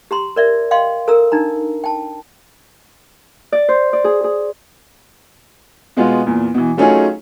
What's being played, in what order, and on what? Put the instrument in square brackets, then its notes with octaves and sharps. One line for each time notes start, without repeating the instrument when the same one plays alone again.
[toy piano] G4 A#5 C6
A#4 D5 E5
D#5 F5 G5 C6
A4 A#4 A#5 E6
D4 D#4 A#5
G5 A5
[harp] D5
C5
D5
G#4
G#4
[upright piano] B2 G#3 B3 F4
E2 A#2
B2 E3
F#3 A3 C#4 D#4 F4 G#4